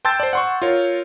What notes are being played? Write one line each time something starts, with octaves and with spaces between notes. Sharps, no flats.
G5 A5 C6 E6 G6 A6
C5 D5
F#5 C6 C#6
F4 A#4 C#5